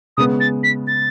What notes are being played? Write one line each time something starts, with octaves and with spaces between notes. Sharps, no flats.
C#3 G#3 B3 D#6
A6
B6
A6